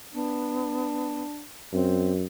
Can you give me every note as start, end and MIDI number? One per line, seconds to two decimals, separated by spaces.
0.14 1.23 59
0.14 1.44 62
1.73 2.25 42
1.73 2.12 60